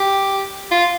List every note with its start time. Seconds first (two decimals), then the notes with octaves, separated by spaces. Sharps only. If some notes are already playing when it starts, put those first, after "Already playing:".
Already playing: G4
0.71 F4